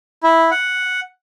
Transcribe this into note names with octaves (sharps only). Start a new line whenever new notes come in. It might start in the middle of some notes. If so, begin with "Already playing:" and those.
E4
F#5